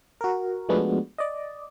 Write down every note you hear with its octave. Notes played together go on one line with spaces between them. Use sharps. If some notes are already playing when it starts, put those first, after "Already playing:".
F#4 A#4
F3 G#3 A3 B3 D4 F#4
D5 D#5